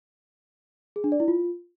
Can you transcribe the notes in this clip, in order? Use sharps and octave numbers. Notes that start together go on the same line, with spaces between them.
G#4
D4
D5
E4
F4